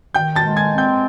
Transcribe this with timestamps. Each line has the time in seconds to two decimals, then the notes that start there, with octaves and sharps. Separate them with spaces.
0.14 D#3 G5 G6
0.36 A5 A6
0.44 G#3
0.57 G#5 G#6
0.71 C4
0.78 G5 G6